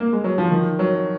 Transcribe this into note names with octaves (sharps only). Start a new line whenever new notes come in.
A#3
G#3
F#3
F3
D#3
F#3